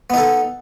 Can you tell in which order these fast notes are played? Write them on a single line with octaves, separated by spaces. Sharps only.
B3 D#4 A4